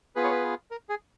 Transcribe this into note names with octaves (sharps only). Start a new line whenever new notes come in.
B3 F4 G#4 B4
C#5
B4
A#4
G#4